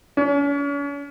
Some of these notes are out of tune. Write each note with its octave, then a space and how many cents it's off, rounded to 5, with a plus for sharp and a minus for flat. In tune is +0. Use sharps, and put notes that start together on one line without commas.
C#4 +40